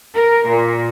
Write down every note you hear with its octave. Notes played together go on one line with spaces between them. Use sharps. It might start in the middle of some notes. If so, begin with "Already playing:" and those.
A#4
A#2